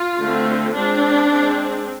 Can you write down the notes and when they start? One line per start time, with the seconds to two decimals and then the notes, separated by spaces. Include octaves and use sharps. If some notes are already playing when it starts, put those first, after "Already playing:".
Already playing: F4
0.18 D3 A3 C4
0.73 G#3 C4 D4
1.29 G#3 C4